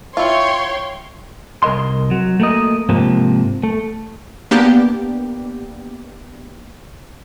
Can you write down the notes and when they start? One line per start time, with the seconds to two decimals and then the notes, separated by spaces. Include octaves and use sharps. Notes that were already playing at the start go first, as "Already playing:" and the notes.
0.17 E4 F4 C#5 G5 C6
1.63 C2 A#4 D#5 C6
2.11 F#3
2.40 A3 A#3 D#5
2.89 G#2 C3 F3 A#3
3.63 A3
4.51 A#3 B3 D4 G4